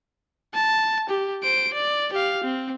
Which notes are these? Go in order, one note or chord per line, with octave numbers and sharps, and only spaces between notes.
A5
G4
C5 D7
D5
G4 F5
C4